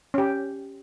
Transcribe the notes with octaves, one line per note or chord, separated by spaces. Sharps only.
C#4 G4